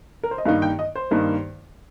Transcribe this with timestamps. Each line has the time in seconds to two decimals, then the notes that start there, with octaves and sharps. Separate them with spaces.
0.23 A#4
0.31 C5
0.38 D#5
0.46 G2 D#3 A#3 D#4 F5
0.62 G5
0.79 D#5
0.95 C5
1.11 G2 D#3 A#3 D#4